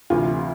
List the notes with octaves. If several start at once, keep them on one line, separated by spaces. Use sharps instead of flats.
D2 C3 E3 F4